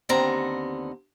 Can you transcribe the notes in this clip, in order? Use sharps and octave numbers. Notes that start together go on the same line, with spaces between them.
D#2 D3 B3 C4 A#5